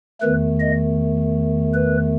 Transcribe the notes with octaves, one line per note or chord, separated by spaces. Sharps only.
E2 D#3 A3 B4
D#5
B4